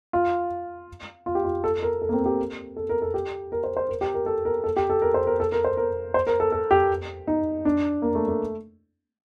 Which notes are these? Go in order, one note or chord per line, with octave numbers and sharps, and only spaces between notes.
F4
F4
G4
F4
A4
A#4
A4
A#3
C4
G4
A4
A#4
A4
G4
A#4
C5
C5
A#4
G4
A#4
A4
A#4
A4
G4
A4
A#4
C5
A#4
A4
A#4
C5
A#4
C5
A#4
A4
A4
G4
D#4
D4
A#3
A3
A3